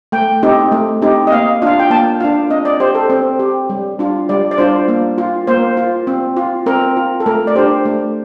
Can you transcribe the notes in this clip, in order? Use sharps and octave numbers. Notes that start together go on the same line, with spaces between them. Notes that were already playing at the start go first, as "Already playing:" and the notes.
A3 G5
C4 D#4 G4
A3
C4 D#4 G4
D#5
A#3 F5
D4 F4 F5
G5
A#3 A5
D4 F4 F5
C4 D#5
D5
G4 C5
A4
C4 C5
G4
G3
D4 F4
G3 D5
D5
D4 F4 C5
A#3
F4
A#3 C5
F4
C4
F4
C4 A#4
F4
A4
A3 A#4
D5
D4 G4 C5
A3